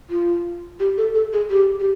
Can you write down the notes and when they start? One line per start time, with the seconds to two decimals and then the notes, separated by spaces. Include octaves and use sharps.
0.10 F4
0.80 G4
0.98 A4
1.15 A4
1.33 G#4
1.50 G4
1.80 G4